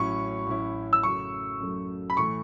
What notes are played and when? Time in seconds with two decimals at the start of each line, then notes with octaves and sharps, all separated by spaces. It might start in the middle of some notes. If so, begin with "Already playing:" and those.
Already playing: A1 A2 F#3 C#4 E4 C#6
0.47 A1 A2 F#3 C#4 E4
0.93 E6
1.03 F#2 C#3 F#3 A3 C#6
1.60 F#2 C#3 F#3 A3
2.10 B5
2.17 A2 E3 A3 C#6